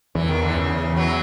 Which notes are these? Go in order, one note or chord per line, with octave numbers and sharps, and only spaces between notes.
E2 E3
D#3
D3 E3
E2 C#3
E3 F#3